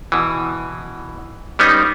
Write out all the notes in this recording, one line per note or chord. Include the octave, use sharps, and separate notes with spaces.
B2 E3
G3 B3 C#4 D#4